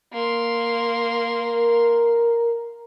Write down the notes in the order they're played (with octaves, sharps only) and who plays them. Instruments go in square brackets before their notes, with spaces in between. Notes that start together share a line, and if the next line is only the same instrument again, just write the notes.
[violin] A#3 C6
[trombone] A#4